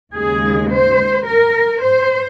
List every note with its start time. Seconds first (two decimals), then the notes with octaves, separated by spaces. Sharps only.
0.14 D#2 C#3 G#3 G#4
0.70 C5
1.26 A#4
1.82 C5